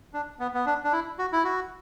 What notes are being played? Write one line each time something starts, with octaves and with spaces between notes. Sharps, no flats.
D4
B3
B3
D4
D4
E4
F#4
E4
F#4